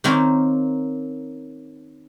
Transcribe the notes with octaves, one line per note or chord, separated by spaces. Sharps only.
D#3 A#3 C4 C#4